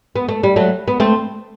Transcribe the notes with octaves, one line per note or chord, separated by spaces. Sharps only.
B3
A3
G3
F#3 A3
B3
A3 C4